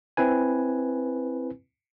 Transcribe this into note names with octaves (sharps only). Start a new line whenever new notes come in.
C4 E4 B4 G#5